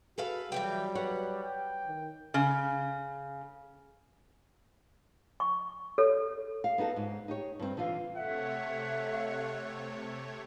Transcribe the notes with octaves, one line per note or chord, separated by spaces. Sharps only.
F#4 G#4 A4 B4 F5
E3 F#3 G3 B3 G5
B4 C#5 F#5
G5
D#3
C#3
C#6
A4 C#5
F5
B3 D#4 F#4 A4
G#2
D#4 G4 C#5
G2 C4
D3 E3 F4 F5
C3 A3 A4 C#5 E5 F#5